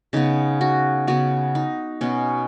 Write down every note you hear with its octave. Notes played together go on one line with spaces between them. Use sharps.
C#3 B3 D#4
F#4
C#3 B3 F#4
D#4
B2 B3 C#4